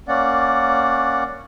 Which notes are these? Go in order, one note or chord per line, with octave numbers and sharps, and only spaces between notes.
A#3 C#4 D5 F#5